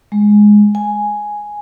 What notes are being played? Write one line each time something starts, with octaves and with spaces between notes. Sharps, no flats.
G#3
G#5